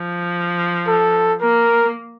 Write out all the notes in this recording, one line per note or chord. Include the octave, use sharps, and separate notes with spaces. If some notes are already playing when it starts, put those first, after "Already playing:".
Already playing: F3
A4
A#3 A#4